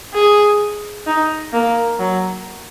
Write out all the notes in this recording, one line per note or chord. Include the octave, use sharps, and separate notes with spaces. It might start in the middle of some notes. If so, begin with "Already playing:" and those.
G#4
D#4
A#3
F#3